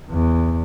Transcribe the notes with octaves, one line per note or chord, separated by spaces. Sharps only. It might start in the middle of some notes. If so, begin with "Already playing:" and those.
E2